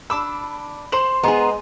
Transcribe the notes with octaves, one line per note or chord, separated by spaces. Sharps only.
D4 B5 D6 E6
C5 C6 E7 F#7
G#3 B3 G#4 A#5 C6